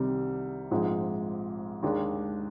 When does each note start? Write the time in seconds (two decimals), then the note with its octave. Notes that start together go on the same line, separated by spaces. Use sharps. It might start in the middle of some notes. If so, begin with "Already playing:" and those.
Already playing: C2 C3 D#3 G3 C4
0.71 A#1 G#2 F3 G#3 C4
1.83 D#2 D#3 G#3 D4